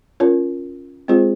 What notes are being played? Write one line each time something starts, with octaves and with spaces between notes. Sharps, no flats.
C#4 F4 A#4 C#5
G#3 C4 F4 G#4 C5